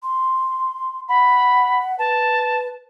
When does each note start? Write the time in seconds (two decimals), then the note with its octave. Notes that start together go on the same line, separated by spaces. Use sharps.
0.03 C6
1.09 F#5 B5
1.99 B4 A5